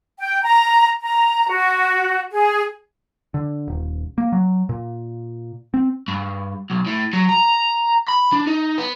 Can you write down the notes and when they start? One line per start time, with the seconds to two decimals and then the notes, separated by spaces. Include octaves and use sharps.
0.19 G5
0.43 A#5
1.01 A#5
1.50 F#4
2.31 G#4
3.34 D3
3.68 D#1
4.18 A#3
4.32 F#3
4.69 A#2
5.74 C4
6.08 G2
6.70 B1
6.87 A2
7.13 F#3
7.29 A#5
8.09 B5
8.33 D4
8.47 D#4
8.78 B3